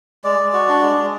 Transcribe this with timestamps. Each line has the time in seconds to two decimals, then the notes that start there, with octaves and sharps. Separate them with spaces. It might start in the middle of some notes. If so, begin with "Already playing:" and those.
0.24 G#3 D5
0.39 G#3
0.53 F#4
0.69 D4
0.83 G#3
0.98 G#3